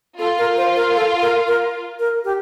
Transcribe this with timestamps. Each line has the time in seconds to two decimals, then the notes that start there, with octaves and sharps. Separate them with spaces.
0.18 F4 A4
0.38 A#4
0.57 C5
0.76 A#4
0.95 A4
1.21 A#4
1.47 A#4
1.99 A#4
2.25 G4